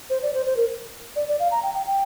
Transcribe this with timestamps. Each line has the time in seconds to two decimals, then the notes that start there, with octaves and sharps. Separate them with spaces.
0.10 C5
0.23 D5
0.34 C5
0.46 C5
0.57 A#4
1.16 D5
1.28 D5
1.40 F5
1.51 A#5
1.63 G5
1.74 G5
1.87 G5